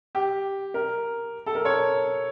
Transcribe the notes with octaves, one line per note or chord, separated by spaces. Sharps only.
G4
A#4
A4
A#4
C#5